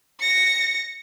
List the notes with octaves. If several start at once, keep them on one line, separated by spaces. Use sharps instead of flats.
A#6 C#7